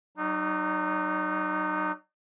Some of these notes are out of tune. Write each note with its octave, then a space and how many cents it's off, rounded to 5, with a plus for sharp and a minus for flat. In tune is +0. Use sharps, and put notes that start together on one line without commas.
F#3 +35 D#4 -25